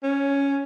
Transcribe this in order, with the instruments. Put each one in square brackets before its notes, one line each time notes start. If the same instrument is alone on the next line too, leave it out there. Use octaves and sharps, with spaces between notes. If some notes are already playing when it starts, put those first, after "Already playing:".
[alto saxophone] C#4